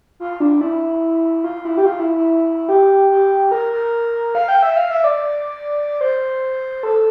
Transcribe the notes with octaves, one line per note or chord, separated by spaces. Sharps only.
F4
D4
E4
F4
E4
G4
F4
E4
E4
G4
G4
A#4
A#4
F5
G5
E5
F5
E5
D5
C5
A4